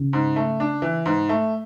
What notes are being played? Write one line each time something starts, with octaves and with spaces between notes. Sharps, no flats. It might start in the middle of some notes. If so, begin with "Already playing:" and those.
Already playing: C#3
G#2
A3
D4
E3
G#2
A3